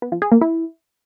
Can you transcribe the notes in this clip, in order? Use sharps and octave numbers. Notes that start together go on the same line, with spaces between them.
B3
F3
G#4
A#3
E4